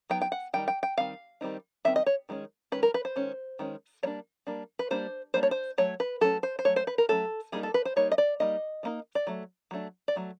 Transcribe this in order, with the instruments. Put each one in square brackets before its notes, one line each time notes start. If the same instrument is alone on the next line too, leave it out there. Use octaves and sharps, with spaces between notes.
[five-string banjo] F#3 B3 D#4 G5
G5
F#5
D#3 G3 D#4 G5
G5
G5
D#3 G3 C4 F5
D#3 G3 C4 D#4
D#3 G3 C4 D#4 E5
D#5
C#5
D#3 G#3 C#4
D#3 G#3 C#4 B4
A#4
B4
C5
D#3 G#3 C#4
D#3 G#3 C#4
G3 A#3 D4 C#5
G3 A#3 D4
B4
G3 A#3 D4 C5
G3 A#3 D4 C5
C#5
C5
F#3 A3 C#5
B4
F#3 A3 C#4 A4
C5
C5
F#3 A3 C#5
C5
B4
A#4
F#3 A3 C#4 A4
G3 A#3 D#4 G#4
A4
B4
C5
G3 A#3 D#4 C#5
D#5
D5
G3 A#3 D#4 D#5
G3 A#3 D#4
D5
F#3 A3
F#3 A3 D4
D5
F#3 A3